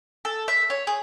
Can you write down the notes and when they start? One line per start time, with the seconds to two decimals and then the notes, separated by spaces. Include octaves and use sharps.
0.25 A4
0.48 E5
0.70 C#5
0.87 G#4